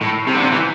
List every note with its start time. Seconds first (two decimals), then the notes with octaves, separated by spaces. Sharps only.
0.02 A2
0.27 C3
0.35 D3
0.43 C3
0.52 E3